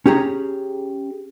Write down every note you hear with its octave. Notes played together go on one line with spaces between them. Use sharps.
C#4 G4 G#4 A#5